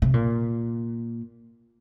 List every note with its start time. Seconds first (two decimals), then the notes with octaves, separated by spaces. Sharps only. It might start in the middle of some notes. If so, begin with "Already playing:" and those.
0.02 C3
0.14 A#2